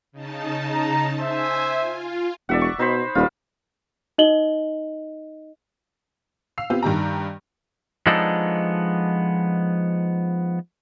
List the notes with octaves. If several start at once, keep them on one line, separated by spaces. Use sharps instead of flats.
C#3 D#4 A5
A#5
C5 E5 G#5
F4
E1 D5 E5 F#5
C#6
B2 D#4 C5 B5
D#1 G3 F4
D#4 D#5 F#7 G7
F5 E6 C7 F7
B3 C4 F4 G4
G2 D#3 G4 A#5
F3 G#3 B3 D4 D#4 A4